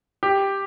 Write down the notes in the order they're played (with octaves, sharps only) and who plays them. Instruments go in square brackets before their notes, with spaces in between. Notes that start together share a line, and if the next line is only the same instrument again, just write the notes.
[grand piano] G4